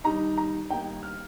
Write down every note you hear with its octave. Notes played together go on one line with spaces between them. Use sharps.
D#3 G3 D#4 A#5
A#5
D#3 G3 A#3 D#4 G5
F6